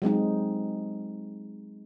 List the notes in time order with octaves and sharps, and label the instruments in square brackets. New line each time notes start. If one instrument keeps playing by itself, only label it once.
[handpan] F#3 G#3 C4 D#4